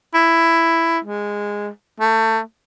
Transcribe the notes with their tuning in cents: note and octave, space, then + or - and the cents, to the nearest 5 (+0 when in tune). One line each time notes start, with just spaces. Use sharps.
E4 +5
G#3 -15
A3 +25